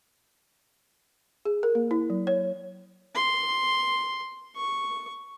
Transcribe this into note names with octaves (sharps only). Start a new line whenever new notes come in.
G#4
A#4
A#3
E4
F#3
C#5
C6
C#6